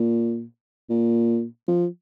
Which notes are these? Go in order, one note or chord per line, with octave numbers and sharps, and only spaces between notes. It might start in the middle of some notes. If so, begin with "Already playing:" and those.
Already playing: A#2
A#2
F3